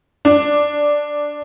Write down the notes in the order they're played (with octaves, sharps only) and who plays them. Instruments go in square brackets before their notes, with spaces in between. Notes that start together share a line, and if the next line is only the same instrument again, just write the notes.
[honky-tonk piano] D4